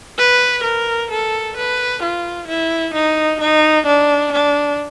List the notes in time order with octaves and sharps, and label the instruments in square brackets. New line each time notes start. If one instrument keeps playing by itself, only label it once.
[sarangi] B4
A#4
A4
B4
F4
E4
D#4
D#4
D4
D4